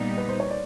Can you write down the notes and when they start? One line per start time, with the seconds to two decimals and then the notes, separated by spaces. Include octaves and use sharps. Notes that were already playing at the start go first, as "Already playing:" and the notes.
Already playing: A#2 G3 B3 D#4 D5
0.18 B4
0.29 C5
0.40 C#5
0.51 D5